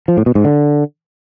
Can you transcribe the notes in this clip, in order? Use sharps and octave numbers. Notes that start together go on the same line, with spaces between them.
F3
A2
B2
G#2
D3